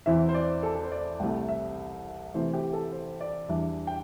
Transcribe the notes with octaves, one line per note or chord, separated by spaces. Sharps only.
E2 E3 C4 E4 E5
C5
D5
A4
A4
C5
D5
C2 C3 A3 G5
E5
C3 E3 A3 C5
G4
A4
C5
D5
E2 E3 G3 D4 E5
G5